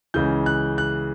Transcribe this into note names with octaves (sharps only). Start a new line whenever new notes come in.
C#2 C#3 E3 G6
F#6
F#6